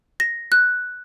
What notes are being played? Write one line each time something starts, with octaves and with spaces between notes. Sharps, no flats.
A#6
F#6